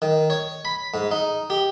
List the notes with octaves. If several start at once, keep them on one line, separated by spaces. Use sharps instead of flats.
D#3
C#5
B5
G#2
D#4
G4